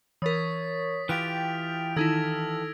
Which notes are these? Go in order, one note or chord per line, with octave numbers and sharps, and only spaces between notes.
E3 A#4 C#5 D#6 A6 B6
E3 F4 G4 G5 F6 F#6 D7 F7
D#3 D#4 E4 A4 E6 G#6 A#6